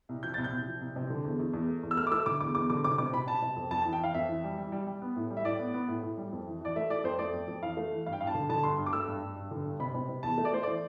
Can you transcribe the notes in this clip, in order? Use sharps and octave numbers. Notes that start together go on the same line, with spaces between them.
C2
F3 G6
C2 A6
G6
C2
F3
C2
C3
D3
E2
E2
E2
A3
E2
E6
A3 F6
D6
A3 E6
D3 D6
E2 D6
E2 D6
D3 D6
C3 D6
C3 D6
C3 B5
C3 A5
C3
F2
F2 A5
E3 A5
G5
E3 F5
F2 E5
E3
G3
G3
G3
G3
B3
A2
G3
E5
A2 D5
B3
B3
A2
A2
G3
F2
E3
E3 D5
A3 E5
A3 D5
F2 C5
A3 D5
F2
F2
E3 F5
A3
E3
G2 F5
G5
G2 F5
A5
D3
D3 A5
G2 C6
G2
D6
A3 E6
G2
G2
G2
D3
G2
C3 B5
C3
C3
E2 A5
A3
D5
A3 C5
E3 D5